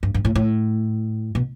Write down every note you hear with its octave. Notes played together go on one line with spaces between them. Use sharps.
G2
G2
A2
A2
B2